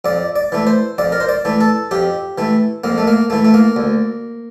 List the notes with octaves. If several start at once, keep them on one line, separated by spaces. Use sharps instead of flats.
F2 D5
D5
E3 A3
C5
F2 D5
A#4
C5
D5
E3 A3
A4
F2 G4
E3 A3
F2 A#3
A3
A#3
E3 A3
A3
A#3
D2